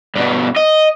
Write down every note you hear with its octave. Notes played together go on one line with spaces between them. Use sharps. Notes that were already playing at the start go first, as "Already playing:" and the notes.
G2 B2
D#5